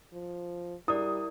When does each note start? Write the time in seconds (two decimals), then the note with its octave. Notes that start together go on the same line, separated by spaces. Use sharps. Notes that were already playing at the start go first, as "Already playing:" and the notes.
0.13 F3
0.88 G3 E4 A#4 D5 D#6